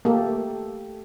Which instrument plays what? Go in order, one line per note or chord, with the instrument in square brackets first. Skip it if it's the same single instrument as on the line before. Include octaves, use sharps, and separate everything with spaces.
[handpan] A3 G4 A4 [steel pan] A#3